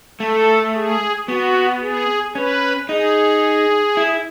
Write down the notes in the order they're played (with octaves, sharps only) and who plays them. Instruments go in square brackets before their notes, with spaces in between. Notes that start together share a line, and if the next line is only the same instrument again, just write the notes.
[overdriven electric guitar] A3 [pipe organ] A4
[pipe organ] G#4
[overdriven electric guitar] B3 [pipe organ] F#4
[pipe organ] G#4
[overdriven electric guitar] C#4 [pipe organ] B4
[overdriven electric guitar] D#4 [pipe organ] G#4
[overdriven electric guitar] E4